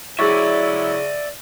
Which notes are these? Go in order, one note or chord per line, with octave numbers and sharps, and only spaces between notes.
F#3 E4 G#4 D5 E5 C#6